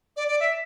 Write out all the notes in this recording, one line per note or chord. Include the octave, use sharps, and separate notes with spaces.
D5
D5
E5